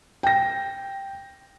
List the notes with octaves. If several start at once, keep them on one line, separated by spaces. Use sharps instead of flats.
G5 A#6